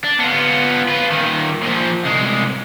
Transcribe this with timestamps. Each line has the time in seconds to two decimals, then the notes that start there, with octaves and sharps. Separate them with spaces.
0.04 D4
0.20 B3 F4
0.89 F4 B4
1.12 A#2 D#3
1.62 A#2 F3
2.05 C2 G#3